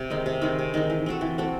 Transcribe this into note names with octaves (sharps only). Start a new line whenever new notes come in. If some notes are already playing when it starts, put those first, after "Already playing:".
Already playing: C3
D#3 G#3 D#4
C3
D#3 G#3 D#4
C3
D#3 G#3 D#4
E3
C4 F#4 A4
E3
C4 F#4 A4